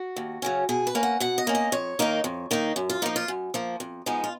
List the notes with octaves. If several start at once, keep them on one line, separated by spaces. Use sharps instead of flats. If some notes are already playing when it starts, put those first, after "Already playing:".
Already playing: F#4
D#2
C#3 F#3 C#4
B2 G#4
B4
A#3 C#4
F#5
B2 F#5
D#5
A#3 C#4
D#5
F2 C#5
D#3 A#3 D#4
F2
D#3 A#3 D#4
F#2
F4
F3 A#3 D#4
F4
F#2
F3 A#3
F2
F3 G#3 B3 D#4
F4